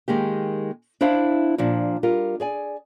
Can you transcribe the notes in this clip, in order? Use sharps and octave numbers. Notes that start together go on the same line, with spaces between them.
D#3 G#3 A#3 G4
D4 E4 C5 E5 F5
A#2 F3 D4
G3 F4 A#4
G#4 D5 G#5